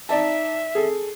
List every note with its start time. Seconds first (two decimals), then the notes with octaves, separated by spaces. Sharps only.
0.09 D#4 D5 E5 A5
0.75 G#4 A4